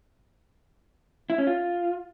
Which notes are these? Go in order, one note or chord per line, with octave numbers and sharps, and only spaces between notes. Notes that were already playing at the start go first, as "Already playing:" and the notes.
E4
C#4
F4